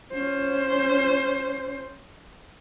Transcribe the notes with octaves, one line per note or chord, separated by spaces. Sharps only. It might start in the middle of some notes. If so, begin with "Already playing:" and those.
C#4 C5